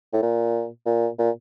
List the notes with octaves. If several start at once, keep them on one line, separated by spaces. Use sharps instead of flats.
A2
A#2
A#2
A#2